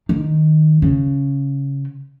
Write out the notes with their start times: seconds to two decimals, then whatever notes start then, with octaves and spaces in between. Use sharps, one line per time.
0.09 D#3
0.82 C#3